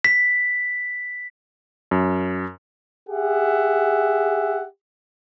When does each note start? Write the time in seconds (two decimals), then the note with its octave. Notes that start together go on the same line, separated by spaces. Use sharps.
0.05 B6
1.91 F#2
3.09 G4 G#4 E5 F#5